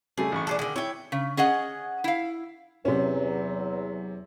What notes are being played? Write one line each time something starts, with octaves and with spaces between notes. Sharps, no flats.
C#3 G3 A3 G#4
A1 C#6
D4 G#4 A4
D3 D#3 G#4
E4 C#5 G5
C#3
C#4 G#4 D#5 F#5
E4 F5
E2 C3 F#3 C#4